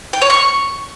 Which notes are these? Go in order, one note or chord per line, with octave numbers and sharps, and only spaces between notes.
G5
C#5
C#6